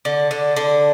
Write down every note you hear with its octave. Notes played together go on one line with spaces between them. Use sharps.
D3
D3
D3